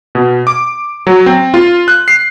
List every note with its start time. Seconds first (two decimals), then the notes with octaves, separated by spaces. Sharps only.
0.15 B2
0.47 D6
1.07 F#3
1.26 C4
1.54 F4
1.88 F#6
2.08 C7